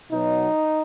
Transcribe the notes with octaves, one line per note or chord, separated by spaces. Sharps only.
B2 F#3 D#4